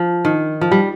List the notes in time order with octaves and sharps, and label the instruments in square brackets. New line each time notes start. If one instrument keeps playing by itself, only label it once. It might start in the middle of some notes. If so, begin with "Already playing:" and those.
Already playing: [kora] F3
D#3
F3
G3